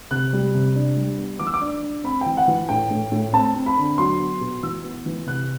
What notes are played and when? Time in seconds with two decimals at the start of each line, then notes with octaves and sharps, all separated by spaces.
0.11 C3 F#6
0.33 G3
0.54 C3
0.76 D4
0.96 G3
1.18 B3
1.39 E3 D6
1.47 E6
1.54 D6
1.61 D4
1.83 D4
2.04 C4 B5
2.21 E3 G5
2.37 F#5
2.48 E3
2.69 A2 G5
2.91 A2
3.12 A2
3.33 C4 A5
3.55 C4
3.66 B5
3.77 D3
3.98 F#3 C6
4.19 B3
4.41 B2
4.63 E3 E6
4.83 B3
5.06 E3
5.26 C3 F#6